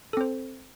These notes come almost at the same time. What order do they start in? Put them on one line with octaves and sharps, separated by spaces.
A4 C4 C5